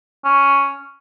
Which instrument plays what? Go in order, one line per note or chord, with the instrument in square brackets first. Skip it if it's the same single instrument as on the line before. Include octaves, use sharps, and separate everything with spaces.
[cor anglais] C#4